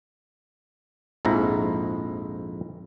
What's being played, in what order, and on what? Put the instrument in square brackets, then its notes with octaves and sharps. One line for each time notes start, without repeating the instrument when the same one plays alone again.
[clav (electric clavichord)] A#1 F2 G#2 E4 A#5